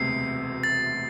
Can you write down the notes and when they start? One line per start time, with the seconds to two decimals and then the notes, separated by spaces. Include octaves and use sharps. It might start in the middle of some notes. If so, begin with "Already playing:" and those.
Already playing: E1 D2 C3 C7
0.64 A6